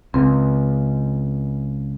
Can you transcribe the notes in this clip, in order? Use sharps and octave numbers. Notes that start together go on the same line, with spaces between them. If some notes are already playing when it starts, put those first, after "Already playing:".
C#2 C4